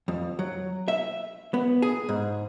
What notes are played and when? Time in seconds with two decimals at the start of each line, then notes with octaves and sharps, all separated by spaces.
0.08 F2
0.39 F#3
0.88 E5
1.54 B3
1.82 G#4
2.09 G#2